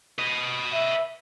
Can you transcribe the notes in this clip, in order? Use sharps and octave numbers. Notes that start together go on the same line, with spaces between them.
B4 D#5
E5